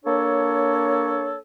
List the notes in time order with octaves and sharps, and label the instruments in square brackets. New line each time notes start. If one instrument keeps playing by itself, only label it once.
[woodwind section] A#3 D4 A4 C#5